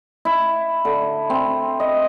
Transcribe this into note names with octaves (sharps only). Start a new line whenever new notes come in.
E4
D3
C4
D#5